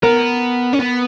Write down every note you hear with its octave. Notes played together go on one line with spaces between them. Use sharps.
B3 A#4
C#4
B3